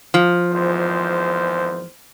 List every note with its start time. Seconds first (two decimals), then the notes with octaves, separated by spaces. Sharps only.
0.14 F3
0.52 G#1 E2 C5